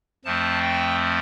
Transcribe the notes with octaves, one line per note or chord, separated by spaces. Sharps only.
F2 F3 A3 C4 A5
G5